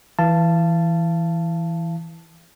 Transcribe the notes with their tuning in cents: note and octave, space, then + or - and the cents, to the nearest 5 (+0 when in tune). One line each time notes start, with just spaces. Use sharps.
E3 +0 F5 -30 A5 +0